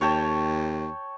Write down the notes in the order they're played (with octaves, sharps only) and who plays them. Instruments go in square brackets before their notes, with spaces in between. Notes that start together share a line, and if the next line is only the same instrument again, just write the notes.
[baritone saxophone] D#2 [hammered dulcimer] C#5 G5 A5